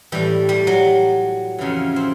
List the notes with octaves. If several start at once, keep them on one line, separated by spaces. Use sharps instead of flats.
A2 E3 G3
G3
F#3
F2 C#3 E3
C4